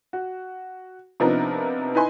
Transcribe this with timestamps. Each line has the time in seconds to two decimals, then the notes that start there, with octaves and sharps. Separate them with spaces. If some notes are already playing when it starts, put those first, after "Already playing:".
0.13 F#4
1.20 C3 F3 B3 D4 D#4 A#4
1.95 D#4 E4 B4 G#5 C6